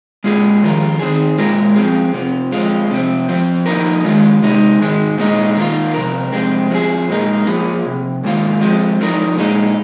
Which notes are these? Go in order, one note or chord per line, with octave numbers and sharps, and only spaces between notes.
A#2 G#3 F4 G#4
F2 D#3 C4 F4 A#4
D#3 C4 G#4
A#2 G#3 F4 A#4
F3 C4 F4 G#4
F2 C3 F3
F2 F3 G#3 F4
C3 F3 C4
F2 F3 C4
F3 A#3 D#4 A#4
D#3 G#3 F4
C3 G#3 D#4
G#2 D#3 G#3
A#2 G#3 D#4
D#3 A#3 F4
F2 C3 A#4
F2 C3 G#3 C4
F3 G#3 C4 G#4
A#2 G#3 D#4 A#4
F3 A#3 F4 G#4
F2 C3
G#2 D#3 A#3 F4
F3 G#3 C4
F2 F3 G#3 D#4 A#4
A#2 G#3 D#4